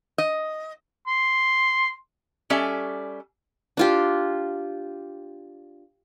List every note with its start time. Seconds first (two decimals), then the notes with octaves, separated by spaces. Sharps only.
0.18 D#5
1.07 C6
2.50 G3 C#4 A4 D5 E5 G#5
3.77 D4 F4 G4